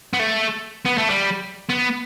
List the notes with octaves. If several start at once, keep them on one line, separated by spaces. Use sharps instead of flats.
B3
A3
B3
A3
G3
B3